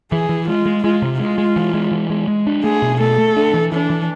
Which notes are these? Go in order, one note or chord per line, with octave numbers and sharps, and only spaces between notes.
E3 G#4
E3
G#3 F4
G#3
G#3 F4
C3
G#3 F4
G#3
E3
G#3
E3
G#3
G#3
D4
A3 G#4
B2
A3 A4
A3
D4
E3
E3 D4
E3